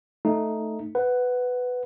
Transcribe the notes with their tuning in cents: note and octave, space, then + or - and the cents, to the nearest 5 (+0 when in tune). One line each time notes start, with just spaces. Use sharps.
A3 +0 D#4 +0
B4 +10 F#5 +0